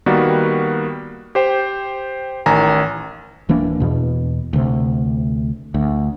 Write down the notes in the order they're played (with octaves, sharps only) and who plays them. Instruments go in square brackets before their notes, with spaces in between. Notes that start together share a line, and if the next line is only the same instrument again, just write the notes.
[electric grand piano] D#3 G3 A#3 B3 F#4
G4 C5 G5
A1 D#3 G#5 A#5
[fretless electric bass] D1 E3 A#3 D4
E2 B2
D2 C3
D2